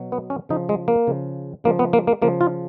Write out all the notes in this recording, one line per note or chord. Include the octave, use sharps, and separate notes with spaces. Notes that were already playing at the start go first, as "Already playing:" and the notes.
Already playing: B2 F#3
B3
C#4
C#3 F3 D#4
G#3
A#3
C#3 F3
C#3 F3 A#3
B3
A#3
A#3
C#3 F3 A#3
F4